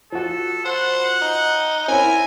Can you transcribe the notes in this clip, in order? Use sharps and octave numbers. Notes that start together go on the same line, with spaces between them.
F3 F#4 A4
C5 F#5
D#4
C4 C#4 E4 A#4 G#5